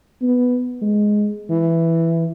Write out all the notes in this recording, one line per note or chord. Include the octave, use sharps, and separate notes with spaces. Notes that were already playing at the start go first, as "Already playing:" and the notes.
B3
G#3
E3